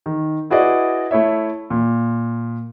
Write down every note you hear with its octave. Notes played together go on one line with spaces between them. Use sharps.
D#3
E4 F#4 G#4 B4 D5 D#5
A3 E4 C#5 E5
A#2